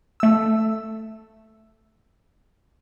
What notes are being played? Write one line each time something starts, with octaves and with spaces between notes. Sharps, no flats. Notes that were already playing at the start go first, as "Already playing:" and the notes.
A3 E6